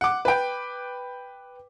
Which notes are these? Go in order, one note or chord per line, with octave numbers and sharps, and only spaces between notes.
F#5 D6
B4 G5